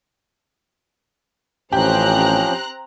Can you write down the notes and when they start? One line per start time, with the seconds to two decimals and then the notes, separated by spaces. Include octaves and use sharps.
1.72 A1 F3 C4 C#4 G4 A#5 F#6